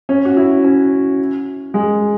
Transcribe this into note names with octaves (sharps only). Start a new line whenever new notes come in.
C#4
F#4
E4
C#4
G#3